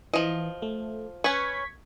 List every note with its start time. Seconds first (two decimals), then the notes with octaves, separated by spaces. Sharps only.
0.14 E3 F3 D#5
0.62 A3
1.24 C#4 B4 C#6 G#6 B6